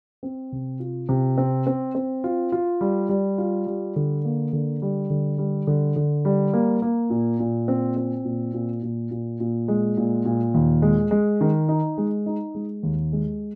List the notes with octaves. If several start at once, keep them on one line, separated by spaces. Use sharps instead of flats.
C4
C3
F4
C3
C4
C4
C4
F4
F4
G3
G3
F4
G3
D3
A#3
D3
G3
D3
G3
D3
D3
G3
A#3
A#3
A#2
A#2
C4
C4
A#2
A#2
A#2
A#2
A#2
G#3
A#2
A#2
D#2
G#3
G#3
D#3
D#4
G#3
D#4
G#3
D#2
G#3